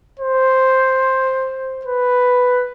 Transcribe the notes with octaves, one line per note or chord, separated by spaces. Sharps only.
C5
B4